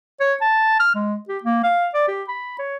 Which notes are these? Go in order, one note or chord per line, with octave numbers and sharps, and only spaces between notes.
C#5
A5
F6
G#3
G4
A#3
F5
D5
G4
B5
C#5